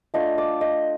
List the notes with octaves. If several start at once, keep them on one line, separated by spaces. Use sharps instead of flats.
A3 D4 F4 D#5
D5
D#5